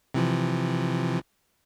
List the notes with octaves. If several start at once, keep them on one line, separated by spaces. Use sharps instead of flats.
C3 E3 F3